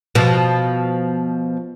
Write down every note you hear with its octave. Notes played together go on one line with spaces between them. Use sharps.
B2 F3